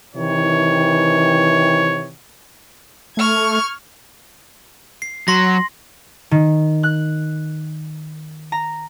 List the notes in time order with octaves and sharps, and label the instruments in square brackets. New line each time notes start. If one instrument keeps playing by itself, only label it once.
[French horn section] C3 D#3 E3 [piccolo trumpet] C#5
[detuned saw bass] A3 [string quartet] C#6 F6 G#6
[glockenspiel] C7
[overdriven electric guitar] F#3 [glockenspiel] C6 A#6
[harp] D#3
F#6
A#5